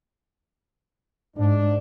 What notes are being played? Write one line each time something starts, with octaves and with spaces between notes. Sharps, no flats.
G#2 D4